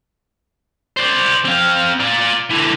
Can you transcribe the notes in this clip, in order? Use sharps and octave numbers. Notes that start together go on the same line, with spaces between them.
C5 D5
C4 F5
F4 D5
D3 E3